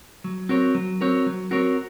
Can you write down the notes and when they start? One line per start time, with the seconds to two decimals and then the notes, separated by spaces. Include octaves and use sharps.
0.24 F#3
0.49 C4 F#4 A#4 C#5
0.75 F#3
1.01 C4 F#4 A#4 C#5
1.26 F#3
1.51 C4 F#4 A#4 C#5